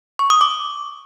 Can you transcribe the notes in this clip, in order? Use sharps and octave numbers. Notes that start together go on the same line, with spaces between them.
C#6
D#6
D6